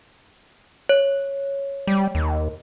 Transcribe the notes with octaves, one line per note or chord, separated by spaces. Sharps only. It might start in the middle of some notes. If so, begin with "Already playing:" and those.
C#5
G3
D#2